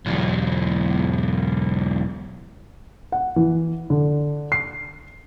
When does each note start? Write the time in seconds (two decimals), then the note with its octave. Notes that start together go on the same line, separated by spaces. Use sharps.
0.06 B1 E2
3.12 F#5
3.36 E3
3.90 D3
4.52 C7